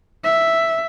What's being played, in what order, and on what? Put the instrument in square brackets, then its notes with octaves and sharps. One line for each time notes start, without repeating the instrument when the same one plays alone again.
[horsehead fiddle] E5